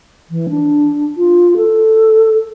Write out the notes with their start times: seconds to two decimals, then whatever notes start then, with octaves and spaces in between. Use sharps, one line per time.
0.31 E3
0.49 D4
1.17 F4
1.57 A4